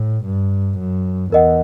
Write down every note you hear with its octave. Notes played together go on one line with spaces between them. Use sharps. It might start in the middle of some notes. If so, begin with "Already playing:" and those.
Already playing: A2
G2
F#2
E2 A#4 D#5 F#5